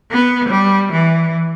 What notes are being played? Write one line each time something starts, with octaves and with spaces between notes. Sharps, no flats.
B3
G3
E3